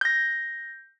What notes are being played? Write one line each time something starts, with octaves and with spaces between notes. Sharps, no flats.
G6 A#6